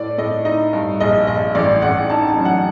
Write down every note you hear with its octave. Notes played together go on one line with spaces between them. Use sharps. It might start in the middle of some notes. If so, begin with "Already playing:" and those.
Already playing: A2 D5
A2 D#5
D#4 D#5
G2
A#1 D#5
A#1 D#5
A1 D5
A1 F#5
D#4 A5
A5
F#2
F#5